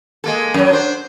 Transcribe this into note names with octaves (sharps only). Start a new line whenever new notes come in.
G#3 A#3 A4
F#2 F#3
D4 C5